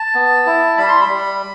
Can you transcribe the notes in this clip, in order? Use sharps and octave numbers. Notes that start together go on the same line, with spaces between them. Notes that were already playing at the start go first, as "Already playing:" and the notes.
Already playing: A5
B3
E4
G3 B5
C6
B5
G3